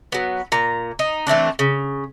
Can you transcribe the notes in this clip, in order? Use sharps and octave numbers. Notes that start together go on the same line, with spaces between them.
F#3 B3
A#2 A#5
D#4
E3 A3 C4 D4
C#3